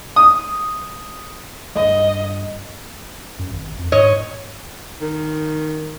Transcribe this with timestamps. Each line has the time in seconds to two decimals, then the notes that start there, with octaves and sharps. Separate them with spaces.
0.16 D#6
1.75 G2 D#5
3.39 F#2
3.52 G#1
3.79 F2
3.92 G#2 C#5 D#5
5.01 D#3